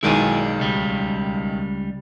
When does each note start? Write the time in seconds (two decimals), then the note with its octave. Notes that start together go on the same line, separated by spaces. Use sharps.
0.03 B1 D#3 G#3 E4 D5 G#5
0.59 C#2 G3